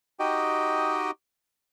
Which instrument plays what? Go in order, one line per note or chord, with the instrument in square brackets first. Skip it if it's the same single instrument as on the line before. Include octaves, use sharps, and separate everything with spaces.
[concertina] D#4 F#4 G4 D#5 G5